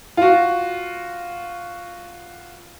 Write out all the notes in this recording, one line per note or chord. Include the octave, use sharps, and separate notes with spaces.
F4 F#4